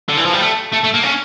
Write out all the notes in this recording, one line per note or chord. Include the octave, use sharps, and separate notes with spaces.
D3
E3
F3
G3
A3
A3
A3
A#3
C#4